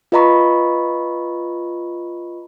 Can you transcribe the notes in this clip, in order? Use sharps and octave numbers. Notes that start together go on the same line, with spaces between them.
F4 B4 D#5 A#5 B5 C#6